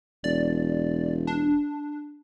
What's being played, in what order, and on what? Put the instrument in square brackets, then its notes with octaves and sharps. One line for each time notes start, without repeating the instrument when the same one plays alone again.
[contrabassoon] E1 [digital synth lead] D5
[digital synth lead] D4